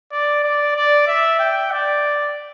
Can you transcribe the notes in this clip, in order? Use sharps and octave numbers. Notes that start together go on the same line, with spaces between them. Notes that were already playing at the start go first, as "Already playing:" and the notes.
D5
D5
D5
E5
G5
D5